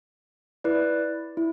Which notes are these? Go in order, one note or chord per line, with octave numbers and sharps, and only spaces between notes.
E4 B4 D5
E4